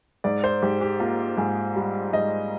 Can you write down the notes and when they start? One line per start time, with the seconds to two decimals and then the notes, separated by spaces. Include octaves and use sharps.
0.24 G#2 D5
0.44 C5
0.62 G#2 G4
0.81 G4
1.00 A#3 F4
1.37 G#2 G#4
1.76 G3
2.13 G#2 D#5